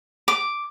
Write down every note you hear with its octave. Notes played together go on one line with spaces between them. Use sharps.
D6